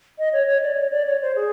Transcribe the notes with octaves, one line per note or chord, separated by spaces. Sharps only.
D#5
C#5
C#5
D5
C#5
D5
C#5
C5
G#4